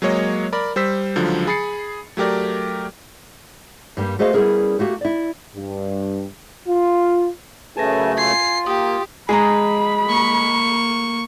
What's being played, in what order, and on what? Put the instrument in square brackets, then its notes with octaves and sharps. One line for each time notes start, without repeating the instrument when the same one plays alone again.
[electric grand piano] F#3 G#3 A#3 C#5 D#5
A#4 D5 B5
G3 C5 E6 B6
C#2 D3 F3 F#3
G#4 B5 A6 C7 C#7
F#3 A3 G4 A#4 D5
[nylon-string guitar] G2 G3 A#3
A3 F#4 G#4 C5 D#5 F5
G3 B3 C#4 E4 G#4 A#4
A3 A#3 F#4 G4
E4 D5
[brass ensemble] G2
F4
[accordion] F#2 C#3 A3 [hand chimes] G#4 B4 A#6 [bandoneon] G#5 A5
[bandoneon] F4 [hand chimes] G#5 G#6 [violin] C7
[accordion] A#3 [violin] G4 [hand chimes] G5 D#6
[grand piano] G#3 [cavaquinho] G#4 D#5 A#5 [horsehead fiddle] B5
[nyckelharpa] A#3 C#6